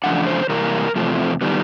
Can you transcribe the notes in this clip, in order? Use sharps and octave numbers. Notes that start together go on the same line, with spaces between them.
E2 C#3 F3 A3 D4 F#5
C5
C3 E3 G3 A#3 A#4
E2 C3 F3 A3 C4
D#3 G3 B3